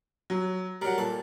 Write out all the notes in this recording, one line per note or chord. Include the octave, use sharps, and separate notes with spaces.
F#3
F#3 G3 A#4 F#5
A#2 A4